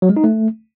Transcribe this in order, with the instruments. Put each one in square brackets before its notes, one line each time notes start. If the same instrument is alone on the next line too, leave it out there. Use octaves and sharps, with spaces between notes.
[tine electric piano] F#3
G#3
D#4
A3